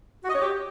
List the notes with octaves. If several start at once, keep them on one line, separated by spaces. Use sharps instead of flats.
F#4
D#5
C#5
G4